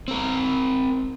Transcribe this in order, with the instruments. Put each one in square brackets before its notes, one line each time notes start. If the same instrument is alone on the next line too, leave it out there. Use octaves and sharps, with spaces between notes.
[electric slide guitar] C4 A#4